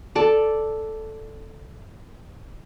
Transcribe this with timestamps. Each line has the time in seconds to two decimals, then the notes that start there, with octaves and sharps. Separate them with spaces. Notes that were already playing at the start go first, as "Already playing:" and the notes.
0.15 A4 D5